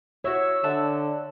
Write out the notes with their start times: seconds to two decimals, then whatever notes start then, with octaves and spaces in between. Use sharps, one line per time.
0.24 E4 F#4 C#5 E6
0.63 D3 E5 F#5 A5